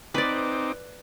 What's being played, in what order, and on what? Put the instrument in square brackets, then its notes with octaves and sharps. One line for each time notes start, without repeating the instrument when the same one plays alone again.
[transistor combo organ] C4 D#4 D6 [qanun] B4 D5